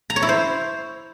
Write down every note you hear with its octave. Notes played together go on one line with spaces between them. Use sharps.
A#5
C#5
E4
C5